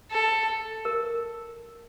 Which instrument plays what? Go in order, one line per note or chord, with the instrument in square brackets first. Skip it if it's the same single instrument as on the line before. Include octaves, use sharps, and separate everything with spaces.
[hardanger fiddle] A4
[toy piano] A#4